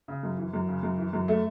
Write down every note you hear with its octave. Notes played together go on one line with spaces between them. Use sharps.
C#3
F#2
E3
F#2
C#3
F#2
E3
F#2
A3